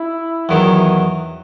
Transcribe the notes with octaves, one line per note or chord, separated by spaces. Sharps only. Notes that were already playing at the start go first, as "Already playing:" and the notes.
Already playing: E4
E2 D#3 F#3